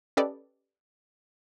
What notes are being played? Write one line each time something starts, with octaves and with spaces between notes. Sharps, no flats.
C#4 G4 A4 B4 D5 D#5